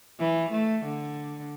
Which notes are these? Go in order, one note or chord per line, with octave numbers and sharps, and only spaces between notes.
E3
A3
D3